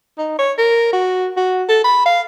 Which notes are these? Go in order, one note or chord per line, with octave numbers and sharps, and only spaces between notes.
D#4
C#5
A#4
F#4
F#4
A4
B5
F5